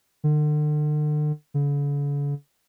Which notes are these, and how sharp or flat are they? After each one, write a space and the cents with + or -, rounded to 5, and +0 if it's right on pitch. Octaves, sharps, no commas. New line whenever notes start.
D3 +40
D3 -45